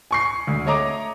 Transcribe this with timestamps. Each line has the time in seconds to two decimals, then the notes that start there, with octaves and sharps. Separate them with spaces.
0.11 G#5 C#6 C7
0.47 D2
0.66 A3 C#5 D#5 A#5 D6